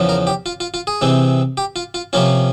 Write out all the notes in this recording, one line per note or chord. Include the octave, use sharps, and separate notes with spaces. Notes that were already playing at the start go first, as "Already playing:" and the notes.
Already playing: E2 C#3 F3
A#4
G4
F4
F4
F4
G#4
C3 E3 G#3 C4
G4
F4
F4
C3 F3 A#3 C#4 F4